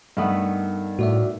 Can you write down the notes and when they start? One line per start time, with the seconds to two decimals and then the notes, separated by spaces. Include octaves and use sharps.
0.17 G2 D#3 A3 B3
0.99 A2 F#4 D5 E5